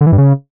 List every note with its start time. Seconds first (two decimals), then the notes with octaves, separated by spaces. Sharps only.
0.01 D3
0.07 E3
0.12 G2
0.18 C#3